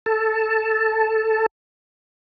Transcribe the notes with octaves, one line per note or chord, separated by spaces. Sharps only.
A4 A5